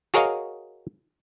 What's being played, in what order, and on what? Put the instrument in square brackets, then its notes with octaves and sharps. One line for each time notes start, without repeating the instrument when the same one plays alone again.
[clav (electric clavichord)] F#4 G#4 A#4 C#5 D#5 F5